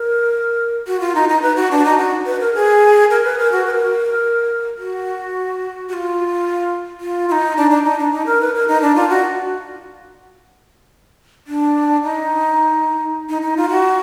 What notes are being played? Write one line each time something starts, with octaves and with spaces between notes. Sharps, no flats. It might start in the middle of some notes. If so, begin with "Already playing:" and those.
Already playing: A#4
F#4
F4
D#4
D#4
B4
F#4
D4
D#4
F#4
B4
A#4
G#4
A#4
B4
A#4
F#4
B4
A#4
F#4
F#4
F4
F4
F4
D#4
D4
D4
D#4
D4
D#4
A#4
B4
A#4
D#4
D4
F4
F#4
D4
D#4
D#4
D#4
F4
F#4